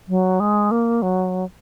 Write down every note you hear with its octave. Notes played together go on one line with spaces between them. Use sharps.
F#3
G#3
A#3
F#3